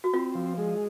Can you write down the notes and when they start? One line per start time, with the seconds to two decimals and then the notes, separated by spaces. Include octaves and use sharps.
0.04 F#4
0.13 C4 F4
0.35 F3
0.58 G#3